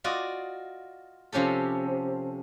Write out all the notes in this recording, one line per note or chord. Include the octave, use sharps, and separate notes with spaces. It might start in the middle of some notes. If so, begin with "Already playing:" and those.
F4 F#4 D5 D#5
C3 F3 C#4 G4 A4